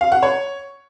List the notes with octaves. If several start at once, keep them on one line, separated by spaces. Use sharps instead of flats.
F5
F#5
C#5